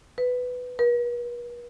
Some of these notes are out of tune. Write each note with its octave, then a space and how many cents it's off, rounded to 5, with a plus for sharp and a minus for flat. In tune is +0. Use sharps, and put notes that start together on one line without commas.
B4 +10
B4 -45